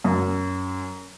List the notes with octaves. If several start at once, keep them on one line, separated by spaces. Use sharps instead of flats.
F#2